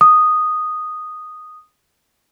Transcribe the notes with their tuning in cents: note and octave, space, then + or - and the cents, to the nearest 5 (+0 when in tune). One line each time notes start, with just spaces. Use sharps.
D#6 -5